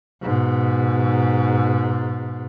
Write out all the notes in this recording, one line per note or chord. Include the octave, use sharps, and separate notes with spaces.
G#2 B2